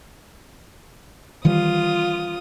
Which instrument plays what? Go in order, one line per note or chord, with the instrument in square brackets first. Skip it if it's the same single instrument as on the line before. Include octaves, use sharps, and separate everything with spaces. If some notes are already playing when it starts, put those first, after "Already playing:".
[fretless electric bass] D#3 E3 G3 [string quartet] F4 D#6